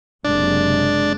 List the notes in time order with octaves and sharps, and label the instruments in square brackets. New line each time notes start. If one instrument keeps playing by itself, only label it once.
[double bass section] F#1 C3 G#3 [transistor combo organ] D4